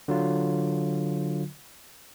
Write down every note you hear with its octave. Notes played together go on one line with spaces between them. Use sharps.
D3 F#3 F4